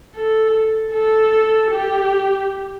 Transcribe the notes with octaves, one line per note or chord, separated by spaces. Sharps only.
A4
A4
G4